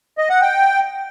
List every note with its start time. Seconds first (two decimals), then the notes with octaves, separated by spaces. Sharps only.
0.18 D#5
0.30 F#5
0.41 G5